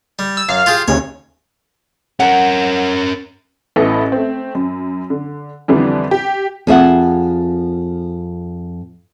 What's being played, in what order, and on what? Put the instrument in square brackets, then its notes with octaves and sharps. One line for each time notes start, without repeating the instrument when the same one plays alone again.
[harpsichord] G3
[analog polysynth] E6
[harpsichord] F#2 [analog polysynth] F5
[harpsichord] F4 G4 G#4
[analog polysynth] D#2 C#3 [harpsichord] C#5
[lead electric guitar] C#4 A#4 [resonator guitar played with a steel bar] F#5
[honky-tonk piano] A1 A2 B3 E4 A4 D#5
A3 C4
F#2
D3
F2 D3 E3 G3 D4
G4
[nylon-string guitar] F2 G#4 E5 F#5